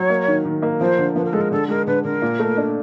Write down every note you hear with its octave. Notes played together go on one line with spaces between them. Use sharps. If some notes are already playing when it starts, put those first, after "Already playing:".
Already playing: F#3 C#5
A#3
D#3
D#3
A#3
F3 C5
D3
F3 B4
A#4
G#3 A4
A#4
D3 A4
G#3 A#4
D3 B4
D3 A#4
A#2
A3
D4